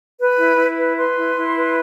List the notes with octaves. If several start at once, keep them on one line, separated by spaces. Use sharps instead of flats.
B4
E4
E4
B4
B4 C6
E4
E4
B4